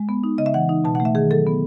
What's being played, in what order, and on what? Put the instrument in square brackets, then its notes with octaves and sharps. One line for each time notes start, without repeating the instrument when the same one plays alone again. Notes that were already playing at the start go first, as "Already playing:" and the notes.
Already playing: [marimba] G#3
B3
D#4
C#3 D#5
E5
E3 F#5
D#4
B2 A5
A3 F#5
E5
D#3 G#4
F#3 A4
B3